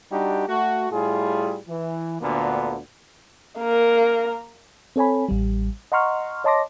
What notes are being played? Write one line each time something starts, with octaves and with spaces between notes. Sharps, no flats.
G3 D4 D#4 F#4 G4
A3 F#4
A2 G3 F4 G#4
E3
D2 A#2 D3 A#3 B3
A#3 A#4
C4 A4 C#5 G#5 B5
A1 G3
D#5 F#5 A#5 C6 C#6 F6
C#5 D#5 A5 C6 D6 A#6